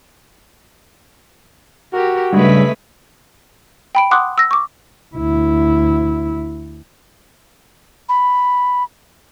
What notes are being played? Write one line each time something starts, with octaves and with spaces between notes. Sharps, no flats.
F#4 G4 A#4
G2 C#3 G#3 A3 B4 E5 B6
G5 B5 D7
F#5 C6 D6 D#6 F#6
E6 A#6
C#6 D6
D2 E4
B5